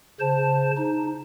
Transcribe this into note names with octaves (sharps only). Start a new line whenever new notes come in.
C#3 C5 A5
D#4